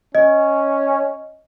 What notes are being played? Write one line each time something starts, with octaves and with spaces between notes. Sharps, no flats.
C#4 D#5